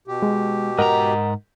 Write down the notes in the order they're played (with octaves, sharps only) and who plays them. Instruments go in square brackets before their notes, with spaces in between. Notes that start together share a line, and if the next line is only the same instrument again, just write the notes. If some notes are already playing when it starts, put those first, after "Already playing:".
[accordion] B2 G4
[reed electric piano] G#3
[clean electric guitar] G#2 A#5 [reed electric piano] A#4 D#5 F#5